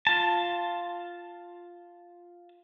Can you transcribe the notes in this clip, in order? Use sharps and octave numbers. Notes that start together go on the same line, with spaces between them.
F4 A5